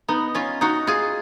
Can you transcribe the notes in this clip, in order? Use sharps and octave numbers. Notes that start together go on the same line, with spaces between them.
B3 D#4
C#4 F4
D#4 F#4
F4 G#4